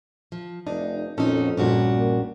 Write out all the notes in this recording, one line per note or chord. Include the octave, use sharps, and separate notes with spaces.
F3
F1 D4 D#4
F2 A#2 C#4 D#4 F#4 A4
A#1 G2 A#2 C#4 D4 F#4
A#3